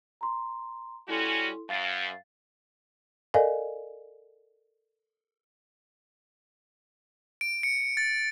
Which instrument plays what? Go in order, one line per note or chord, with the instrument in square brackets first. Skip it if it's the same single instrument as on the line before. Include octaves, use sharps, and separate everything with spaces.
[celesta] A#5 C6
[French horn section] G3 C#4 F#4 [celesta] E4 A4 C6
[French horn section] F#2 [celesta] F5 A6 C7
[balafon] A4 A#4 D5 D#5 F5 G#5
[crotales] D7
C#7
A6